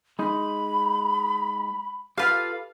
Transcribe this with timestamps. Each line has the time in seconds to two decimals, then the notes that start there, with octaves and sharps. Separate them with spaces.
0.19 G#3 D#4 B5
2.18 F4 G4 A4 B4 F5